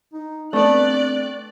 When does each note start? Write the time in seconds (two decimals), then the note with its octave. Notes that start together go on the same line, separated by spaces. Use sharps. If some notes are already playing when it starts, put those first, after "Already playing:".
0.13 D#4
0.53 A3 B3 C4 D4 D5 F#6